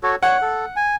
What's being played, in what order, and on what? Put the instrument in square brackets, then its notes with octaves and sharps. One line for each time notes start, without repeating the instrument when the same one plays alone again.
[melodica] F#4 A4 C#5
[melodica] C#5 [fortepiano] F#5
[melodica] A4
G#5